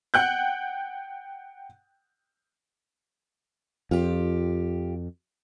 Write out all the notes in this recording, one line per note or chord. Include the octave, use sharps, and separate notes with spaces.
F#5 G5 F#6 G6
F2 F4 G4